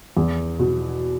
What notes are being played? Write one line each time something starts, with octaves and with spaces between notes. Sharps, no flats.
E2
B2